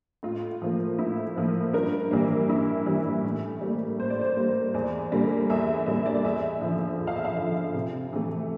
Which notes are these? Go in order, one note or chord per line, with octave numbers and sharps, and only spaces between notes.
A2 F4
F3 A#3
A2 E4
F3 A#3
G2 A#4
E3 G3 A#3
G2 E4
E3 G3 A#3
A2
G3 A#3
A2 C5
D5
C5
G3 A#3
E2 D5
D3 G3 A#3
E2 E5
D3 G3 A#3 E5
D5
E2 E5
D3 F3
E2
F5
E5
F5
D3 F3
C3
E3 A3